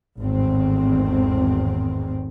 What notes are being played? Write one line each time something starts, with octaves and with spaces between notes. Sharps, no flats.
G#1 E2 A2 D#3 C4